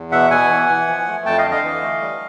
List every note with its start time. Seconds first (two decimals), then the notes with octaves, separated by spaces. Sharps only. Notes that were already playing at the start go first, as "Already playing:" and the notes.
Already playing: E2
0.12 B2 E5 F#5
0.31 B2 F#5 G#5
0.50 E3
0.69 E3
0.88 F3
1.07 A3
1.26 F2 G5 A5
1.38 D#5 F5
1.45 D3
1.51 D#5 F5
1.63 E3
1.82 A3
2.01 G3